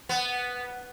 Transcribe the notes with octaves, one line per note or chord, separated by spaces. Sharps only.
B3